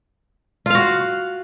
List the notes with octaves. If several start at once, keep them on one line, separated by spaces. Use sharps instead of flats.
F4 F#4 F5